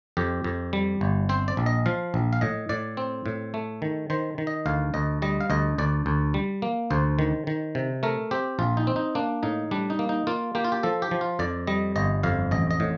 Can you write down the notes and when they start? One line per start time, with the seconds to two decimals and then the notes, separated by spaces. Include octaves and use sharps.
0.17 F2 G4
0.44 F2
0.73 G3
1.01 G1
1.29 C4 C5
1.48 D5
1.57 A#1
1.66 D#5
1.86 F3 F5
2.14 A#1
2.33 F5
2.41 A2 D#5
2.69 A2 D5
2.97 C4
3.26 A2
3.54 A3
3.82 D#3
4.10 D#3 C5
4.38 D#3
4.47 D#5
4.66 D2 F5
4.94 D2 D#5
5.22 G3 D#5
5.41 F5
5.50 D2 D#5
5.78 D2 D5
6.06 D2
6.34 G3
6.62 A#3
6.90 D2 C5
7.19 D#3
7.47 D#3
7.75 C3
8.03 A3 A#4
8.31 C4 G4
8.59 A#1 F4
8.77 D#4
8.87 C4
8.96 D#4
9.15 A#3 D4
9.43 A2 D#4
9.71 G3 D4
9.90 D#4
9.99 A#3
10.09 D#4
10.27 A#3 F4
10.55 A#3 G4
10.64 F4
10.72 G4
10.83 F3 A4
11.02 G4
11.11 F3
11.21 F4
11.39 F2 D5
11.67 G3 D#5
11.96 G1 D#5
12.23 F2 F5
12.51 A1 D#5
12.71 D#5
12.80 A2